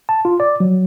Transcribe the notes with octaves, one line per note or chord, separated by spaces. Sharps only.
A5
F4
D5
F#3